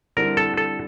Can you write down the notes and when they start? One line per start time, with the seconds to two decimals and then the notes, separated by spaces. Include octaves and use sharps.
0.17 D3 G3 C4 E4 A#4
0.37 A4
0.57 A4